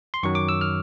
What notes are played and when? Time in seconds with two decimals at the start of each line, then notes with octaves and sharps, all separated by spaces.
0.14 C6
0.23 F#2 D#3 F#3 C#6
0.35 D6
0.49 E6
0.61 F6